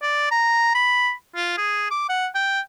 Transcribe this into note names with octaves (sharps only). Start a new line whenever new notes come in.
D5
A#5
B5
F4
G#4
D6
F#5
G5